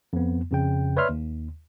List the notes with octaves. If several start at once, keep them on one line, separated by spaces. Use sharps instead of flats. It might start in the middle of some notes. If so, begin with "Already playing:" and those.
F2 B3
F2 C#3 G5
B4 C#5 D5 E5 C6 F6
D#2